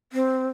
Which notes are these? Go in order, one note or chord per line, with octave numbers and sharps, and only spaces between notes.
C4